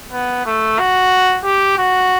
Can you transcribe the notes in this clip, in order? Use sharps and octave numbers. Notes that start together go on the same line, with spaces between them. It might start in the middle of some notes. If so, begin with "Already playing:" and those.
B3
A3
F#4
G4
F#4